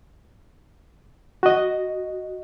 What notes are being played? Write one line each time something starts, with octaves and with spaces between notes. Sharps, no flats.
F#4 D#5